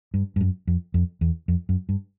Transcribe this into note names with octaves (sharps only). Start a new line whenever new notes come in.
G2
G2
F#2
F2
F2
E2
F2
F#2
G2